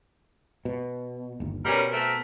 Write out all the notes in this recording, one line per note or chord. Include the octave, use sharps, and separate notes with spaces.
B2
G1 D#2
B2 G3 C#4 A#4
A3 C4 A#4